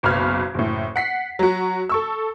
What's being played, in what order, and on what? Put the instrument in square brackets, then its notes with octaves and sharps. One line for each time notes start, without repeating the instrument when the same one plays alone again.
[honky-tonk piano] F#1 B1 B3 B5 F6 G#6
F#1 A2
F#5 B6 C7
F#3 F#4
A4 C#6 E6